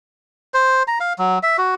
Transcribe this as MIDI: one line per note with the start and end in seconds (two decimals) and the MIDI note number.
0.54 0.83 72
0.88 0.99 82
1.00 1.13 77
1.18 1.39 54
1.43 1.57 76
1.58 1.75 66